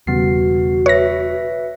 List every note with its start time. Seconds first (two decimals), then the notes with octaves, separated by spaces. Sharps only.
0.07 E1 C#3 G3 B3 F#4 C7
0.86 B4 C#5 E5 A#6